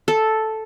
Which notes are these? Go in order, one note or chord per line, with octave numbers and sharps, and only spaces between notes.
A4